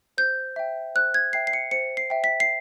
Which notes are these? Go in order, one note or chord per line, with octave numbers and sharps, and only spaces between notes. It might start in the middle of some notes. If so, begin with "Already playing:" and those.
C5 G6
E5 G5
C5 F#6
G#6
E5 G5 C7
C7
C#7
C5 C#7
C7
E5 G5
B6
C7